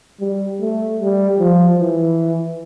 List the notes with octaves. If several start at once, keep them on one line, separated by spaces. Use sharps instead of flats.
G3
A3
G3
F3
E3